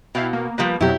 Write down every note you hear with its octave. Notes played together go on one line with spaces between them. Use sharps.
B2 E4 F5 G5
A#3
F3 G3 A#3 B4
F2 B2 F#3 E4 G4